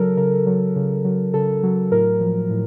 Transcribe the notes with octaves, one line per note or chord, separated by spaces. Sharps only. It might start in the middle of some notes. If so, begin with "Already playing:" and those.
Already playing: C#3 F#3 A4 A#4
C#3 A#4
F#3
C#3
F#3
C#3 A4
F#3
A2 A#4
F3
A2